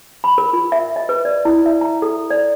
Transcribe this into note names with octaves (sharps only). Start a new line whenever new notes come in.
B5
A#4
F4
E5
D#5
B4
D5
E4
E5
A#5
A4
D5